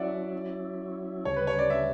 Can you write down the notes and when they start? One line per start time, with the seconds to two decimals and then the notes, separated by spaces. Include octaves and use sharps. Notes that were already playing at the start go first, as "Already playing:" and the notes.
Already playing: F#3 C#4 E4 D5 E5 F#5
1.25 D2 C#3 G3 C#5
1.36 B4
1.47 C#5
1.59 D5
1.70 E5